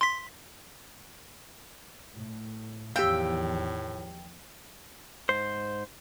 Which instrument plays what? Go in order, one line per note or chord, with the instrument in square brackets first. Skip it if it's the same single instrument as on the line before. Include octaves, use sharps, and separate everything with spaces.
[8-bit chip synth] C6 B6
[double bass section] A2
[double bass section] E2 D#3 F3 [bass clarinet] A2 [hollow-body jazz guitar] G4 F5 [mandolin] G5 E6
[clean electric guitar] G#2 C5